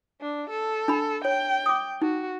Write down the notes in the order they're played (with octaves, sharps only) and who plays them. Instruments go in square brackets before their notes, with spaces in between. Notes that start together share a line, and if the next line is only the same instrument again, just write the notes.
[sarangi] D4
A4
[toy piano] D4 B5
[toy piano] C#5 [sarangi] G5
[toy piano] D6 D#6
[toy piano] D#4 [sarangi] F#4